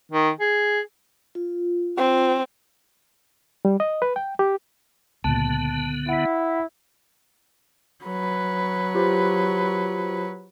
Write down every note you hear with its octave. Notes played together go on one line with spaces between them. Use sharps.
D#3
G#4
F4
C4
G3
D#5
B4
G5
G4
C#2 A#2 D3 B3 A5
E4 F#5 B6
F#3 B4
F4 G4 C5